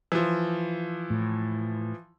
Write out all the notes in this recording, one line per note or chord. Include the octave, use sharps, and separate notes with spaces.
E3 F3
A2